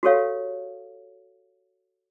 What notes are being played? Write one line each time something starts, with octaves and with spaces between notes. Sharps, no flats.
F#4 G4 A4 C#5 F5